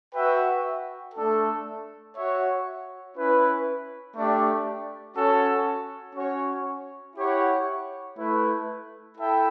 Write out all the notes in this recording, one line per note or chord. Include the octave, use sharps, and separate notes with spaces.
F#4 B4 E5 G5
A3 D4 A4
F#4 C#5 E5
C#4 E4 B4
A3 D4 G4 D5
C#4 F#4 A4 C#5
C#4 F#4 C#5
E4 G4 C#5 F#5
A3 E4 B4
E4 A4 E5 G5